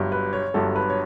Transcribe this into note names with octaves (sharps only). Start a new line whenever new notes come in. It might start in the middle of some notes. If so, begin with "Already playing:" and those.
Already playing: G1 G2 F#3
B4
C#5
G1 G2 F#3 A4
B4
C#5